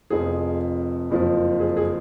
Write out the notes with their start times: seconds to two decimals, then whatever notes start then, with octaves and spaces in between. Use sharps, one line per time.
0.10 F1 F2 F3 G#4
1.11 F#1 F2 F3
1.60 G#4
1.77 G#4